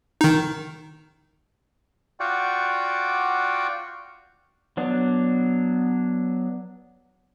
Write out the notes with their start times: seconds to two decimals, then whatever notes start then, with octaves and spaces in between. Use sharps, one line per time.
0.21 D#3 D#4
2.20 F4 F#4 D5 F#5 G5
4.77 F#3 B3 D4